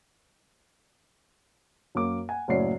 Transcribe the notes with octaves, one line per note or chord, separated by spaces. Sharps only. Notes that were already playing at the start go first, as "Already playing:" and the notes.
F#2 A#3 D6
F#5 G#5
F#1 A2 F#3 C#4 D5 C7